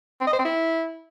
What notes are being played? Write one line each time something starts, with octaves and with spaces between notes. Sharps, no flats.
C4
D#5
C5
C4
E4